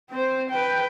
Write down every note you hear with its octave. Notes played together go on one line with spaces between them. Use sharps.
C4 C5
B4 G5